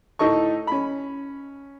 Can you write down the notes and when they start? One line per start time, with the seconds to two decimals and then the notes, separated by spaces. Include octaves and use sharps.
0.19 A2 D#4 A4 D#5 C#6
0.67 C#4 B5